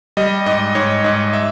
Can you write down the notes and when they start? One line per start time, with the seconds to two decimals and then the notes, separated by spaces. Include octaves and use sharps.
0.17 G3 D#5
0.46 G#2 D#5
0.75 G#2 C#5
1.04 G#2 D#5
1.33 E5